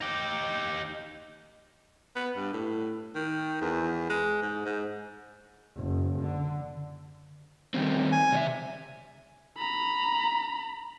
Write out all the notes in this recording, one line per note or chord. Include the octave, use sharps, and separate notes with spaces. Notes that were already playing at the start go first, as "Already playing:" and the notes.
D#4 G4
B3
G2
A2
D#3
E2
G#3
G#2
G#2
F#1
D3
D#3 G3 C4
G#5
C3 D5 E5
A#5 B5